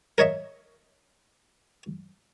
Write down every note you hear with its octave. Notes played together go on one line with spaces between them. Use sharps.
A#4 C#5 D#5 E5